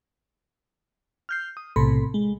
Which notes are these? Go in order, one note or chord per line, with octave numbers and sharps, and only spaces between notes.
F6 G6 C7
D#6
B1 A2 C3 A4 B5 C6
G#3